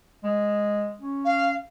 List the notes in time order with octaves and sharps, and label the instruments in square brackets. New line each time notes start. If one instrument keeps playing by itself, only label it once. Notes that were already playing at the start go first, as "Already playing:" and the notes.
[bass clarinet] G#3
C#4
[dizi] F5